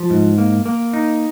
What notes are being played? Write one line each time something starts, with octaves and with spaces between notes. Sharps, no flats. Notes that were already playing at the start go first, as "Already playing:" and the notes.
Already playing: F3
G#2
A#3
A#3
D#4